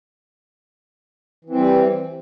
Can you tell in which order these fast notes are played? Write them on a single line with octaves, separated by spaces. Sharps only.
E3 C4 G3